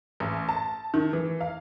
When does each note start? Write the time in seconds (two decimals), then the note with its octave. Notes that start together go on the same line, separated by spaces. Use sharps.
0.20 A1
0.49 A5
0.94 D#3
1.13 E3
1.41 F5